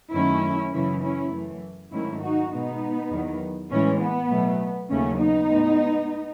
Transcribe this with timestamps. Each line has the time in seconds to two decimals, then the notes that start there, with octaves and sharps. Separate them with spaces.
0.13 F#2 D#3 F#3 A3 C#4 E4
0.73 F#2 C#3 E3 C#4 E4
1.03 C#4 E4
1.32 F#2 E3 A3
1.92 G#2 D#3 F#3 A3 C#4 E4
2.22 D#4 F#4
2.51 B2 G#3 B3 D#4
3.11 E2 D#3 F#3
3.70 A2 E3 G#3 C#4
4.01 B3
4.30 B2 F#3 A3
4.90 D#2 C#3 F#3 A3 C#4
5.19 B3 D#4
5.50 A2 G#3